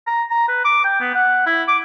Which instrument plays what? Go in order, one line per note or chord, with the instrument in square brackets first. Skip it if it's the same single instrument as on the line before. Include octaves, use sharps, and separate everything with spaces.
[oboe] A#5
A#5
B4
D6
G5
B3
F#5
E4
D6